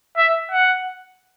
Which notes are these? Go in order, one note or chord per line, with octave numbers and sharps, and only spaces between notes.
E5
F#5